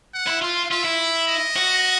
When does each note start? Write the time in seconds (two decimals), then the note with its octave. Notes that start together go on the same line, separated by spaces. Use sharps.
0.14 F#5
0.28 E4
0.42 F4 F5
0.71 F4 E5
0.85 E4
1.28 D#5
1.56 F#4